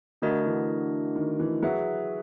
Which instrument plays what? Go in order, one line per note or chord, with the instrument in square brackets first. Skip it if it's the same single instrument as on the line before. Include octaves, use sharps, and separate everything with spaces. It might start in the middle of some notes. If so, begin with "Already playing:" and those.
[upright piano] D3 [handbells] A3 D4 F#4 A#4 D#5
[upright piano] E3
D#3
E3
[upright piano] F#3 [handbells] G#4 B4 E5